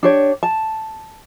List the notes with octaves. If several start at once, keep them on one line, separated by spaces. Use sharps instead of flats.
D4 G4 C#5
A5